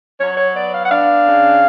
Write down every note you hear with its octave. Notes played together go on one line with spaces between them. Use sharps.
F#3 C#5
C#5
B3 D5
F5
F#5
D4 F5
C#3